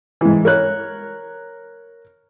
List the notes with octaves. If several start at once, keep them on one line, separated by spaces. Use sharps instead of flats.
G#2 E3
A#4 C#5 F#6